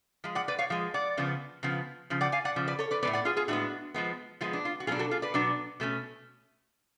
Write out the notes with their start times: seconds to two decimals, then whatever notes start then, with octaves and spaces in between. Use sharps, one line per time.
0.24 F3 G#3
0.35 D5 F#5
0.48 B4 D5
0.59 C#5 F5
0.70 F3 G#3
0.94 D5 F#5
1.17 C#3 F3 B3
1.63 C#3 F3 B3
2.10 C#3 F3
2.21 D5 F#5
2.32 F5 G#5
2.45 D5 F#5
2.56 C#3 F3
2.67 B4 D5
2.79 A4 C#5
2.91 B4 D5
3.03 A2 G#3 B3 B4 D5
3.13 D5 F#5
3.25 F4 G#4
3.37 F4 G#4
3.48 A2 G#3 B3 D4 F#4
3.94 F3 G#3 B3
4.41 F3 G#3 B3 F4
4.53 D4
4.65 F4
4.80 F#4
4.87 B2 F#3 B3 D4 F4 G#4
4.99 F#4 A4
5.11 F4 G#4
5.22 B4 D5
5.34 B2 F#3 B3 D4
5.80 B2 A3 C#4